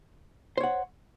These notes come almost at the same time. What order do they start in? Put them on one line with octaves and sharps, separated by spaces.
C5 C#5 F#5